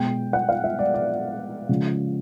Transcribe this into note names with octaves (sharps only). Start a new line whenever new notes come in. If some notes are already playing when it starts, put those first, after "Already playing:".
Already playing: B2 G#3 G5
F#5
F5
E5
D5
D5
C#3 F3 G#3